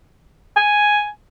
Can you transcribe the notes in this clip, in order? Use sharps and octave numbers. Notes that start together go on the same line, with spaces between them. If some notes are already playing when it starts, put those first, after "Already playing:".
G#5